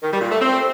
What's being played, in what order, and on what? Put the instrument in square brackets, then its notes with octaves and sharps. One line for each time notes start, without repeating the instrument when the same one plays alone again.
[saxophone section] D#3
G3
A#2
A3
C4